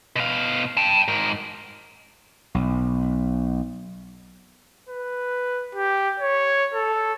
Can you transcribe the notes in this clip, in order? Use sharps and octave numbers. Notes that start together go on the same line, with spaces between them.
B2 F5
G5 A5
G#2 A#4
B1
B4
G4
C#5
A4